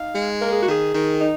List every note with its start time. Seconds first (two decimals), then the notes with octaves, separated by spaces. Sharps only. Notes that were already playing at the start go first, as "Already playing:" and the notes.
Already playing: D#4 F5
0.14 G#3
0.41 A#3 A#4
0.52 G#4
0.62 F#4
0.68 D#3 G#4
0.94 D#3
1.21 D#4